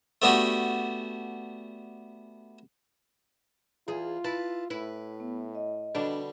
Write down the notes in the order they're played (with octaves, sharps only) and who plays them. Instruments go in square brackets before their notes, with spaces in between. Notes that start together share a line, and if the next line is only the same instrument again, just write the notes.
[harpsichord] A3 B3 D4 F#4 G4
[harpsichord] E2 [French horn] F4 [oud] G#4
[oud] E4 [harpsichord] B4 A5
[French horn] A2 [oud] E4 [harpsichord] B4
[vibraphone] B3
D#5
[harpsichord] B2 D3 G3 [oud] D4